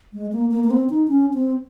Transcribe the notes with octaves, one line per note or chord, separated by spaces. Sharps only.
G#3
A#3
A#3
A#3
C4
D#4
C#4
C4